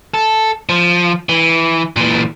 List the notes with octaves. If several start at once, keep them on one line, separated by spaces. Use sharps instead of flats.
A4
F3
E3
A#2 E3